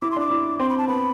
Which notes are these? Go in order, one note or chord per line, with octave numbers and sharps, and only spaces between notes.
E4 D6
C6
D4 D6
E4
C4 C6
B5
A5
B3 B5